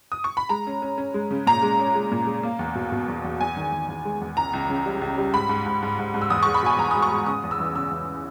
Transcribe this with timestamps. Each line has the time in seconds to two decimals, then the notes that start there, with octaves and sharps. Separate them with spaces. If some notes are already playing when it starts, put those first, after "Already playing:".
0.12 D#6
0.24 C#6
0.37 B5
0.49 G#3 A#5
0.67 C#4
0.82 C#4
0.98 C#4
1.14 G#3
1.31 C#3
1.46 A#2 A#5
1.63 G#3
1.79 C#4
1.95 G#3
2.12 A#2
2.27 G#3
2.43 A#3
2.59 E2
2.75 B2
2.92 B2
3.08 E2
3.24 E2
3.41 E2 G#5
3.57 D#3
3.72 E2
3.88 E2
4.05 G#3
4.21 E2
4.37 C#2 A#5
4.53 C#2
4.70 C#3
4.86 G3
5.02 C#2
5.18 G3
5.33 G#2 B5
5.49 G#2
5.66 G#2
5.83 G#2
5.99 G#2
6.14 G#2
6.21 E6
6.30 E2 D#6
6.43 G#3 C#6
6.54 B5
6.63 B2 G#5
6.78 E2 A#5
6.91 G#3 D#6
7.02 C#6
7.10 G#3
7.26 C#3 D#6
7.44 E2
7.51 E6
7.60 E3
7.75 C#3 E6
7.91 E2